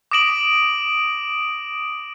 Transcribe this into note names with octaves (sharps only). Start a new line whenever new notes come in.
D6 D#6 A#6 D7 E7 F#7